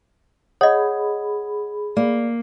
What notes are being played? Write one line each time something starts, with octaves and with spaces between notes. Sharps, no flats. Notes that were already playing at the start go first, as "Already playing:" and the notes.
G#4 C#5 D#5 F#5 B5 D#6
A#3 D5